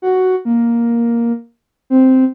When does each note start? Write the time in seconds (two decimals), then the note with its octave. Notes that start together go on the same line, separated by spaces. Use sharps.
0.02 F#4
0.45 A#3
1.90 C4